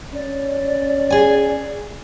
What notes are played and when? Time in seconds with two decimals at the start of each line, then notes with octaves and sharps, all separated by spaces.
0.14 C#4 D5
1.10 G#4 G#5